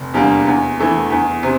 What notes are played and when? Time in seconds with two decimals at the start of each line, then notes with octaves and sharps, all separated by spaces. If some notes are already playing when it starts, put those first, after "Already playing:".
Already playing: F1
0.14 E2 D3 G3 A#3
0.46 E2
0.79 E3 A3
1.11 E2
1.43 C3